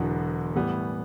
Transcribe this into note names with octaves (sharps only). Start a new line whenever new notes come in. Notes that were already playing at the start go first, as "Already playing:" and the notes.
Already playing: E1 E2 D3 F#3 B3
A2 E3 G3 B3